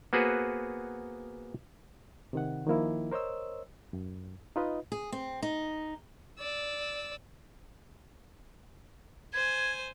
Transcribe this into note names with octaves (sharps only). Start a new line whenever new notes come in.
A#3 B3 F#4 G#4 B4 C5
C3 D#3 F#5
D#3 F3 A#3 E4
A#4 C5 C#5 D#5 E6
F#2
D#4 F4 B4 D#5
G#4
C4
D#4
D5 E6
C5 G#5 G#6